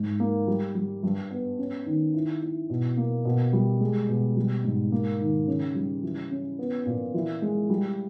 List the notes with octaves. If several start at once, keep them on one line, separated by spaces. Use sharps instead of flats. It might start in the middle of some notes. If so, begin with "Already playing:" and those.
Already playing: G#2
A#3
G3
G3
G2
B3
C#4
D#3
E4
E4
B2
A#3
B2
G3
G#3
B2
G3
G#2
A#3
D#3
C#3
G3
E3
C#4
B3
A#2
E3
G#3
G3